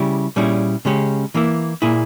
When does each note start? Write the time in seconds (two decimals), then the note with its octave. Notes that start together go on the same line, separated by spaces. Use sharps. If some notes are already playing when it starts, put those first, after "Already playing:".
Already playing: C#3 G3 C#4 E4 G4
0.36 A#2 G3 C#4 E4 G#4
0.85 C#3 G#3 C#4 G4
1.34 E3 A#3 E4
1.82 A#2 A#3 E4 G#4